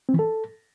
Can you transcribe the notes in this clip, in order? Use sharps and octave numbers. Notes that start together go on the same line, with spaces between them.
C4
E3
A4